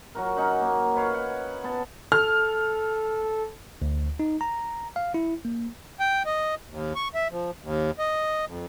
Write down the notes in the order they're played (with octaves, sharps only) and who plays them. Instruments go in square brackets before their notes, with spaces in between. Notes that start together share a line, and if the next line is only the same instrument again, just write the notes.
[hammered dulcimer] F#3 F#4 A#4
C#4 D#4 F#5
A#3
B4 C#5 F5
F#5
B3 A5
[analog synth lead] A4 [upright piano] F6
[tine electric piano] D2
D#4
A#5
F5
E4
A#3
[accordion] G5
D#5
D#2
C#6
E5
F3
D#2
D#5
F2